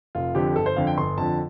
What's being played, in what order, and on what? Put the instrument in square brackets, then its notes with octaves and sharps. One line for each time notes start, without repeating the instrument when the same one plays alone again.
[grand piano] F1 F4
F2 D3 F3 G4
G1 A4
C5
F2 D3 F3 F5
G5
G1 C6
F2 D3 F3 A5